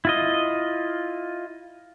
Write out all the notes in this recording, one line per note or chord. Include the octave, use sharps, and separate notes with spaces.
E4 F4 D#5